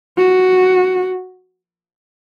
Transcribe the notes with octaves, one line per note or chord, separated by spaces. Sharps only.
F#4